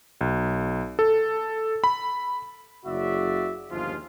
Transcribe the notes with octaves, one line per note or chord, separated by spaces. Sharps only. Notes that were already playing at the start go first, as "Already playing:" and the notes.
B1
A4
B5
F#1 C#3 F#4 D5 E5
G1 D#2 F3 G#3 F4